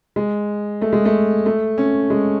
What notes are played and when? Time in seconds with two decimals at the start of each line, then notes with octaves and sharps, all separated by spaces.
0.16 G#3
0.81 A3
0.93 G#3
1.05 A3
1.46 A3
1.78 C#4
2.10 G#3